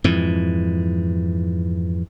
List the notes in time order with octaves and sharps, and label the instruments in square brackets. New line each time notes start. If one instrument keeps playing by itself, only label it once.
[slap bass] F2 G#2 E3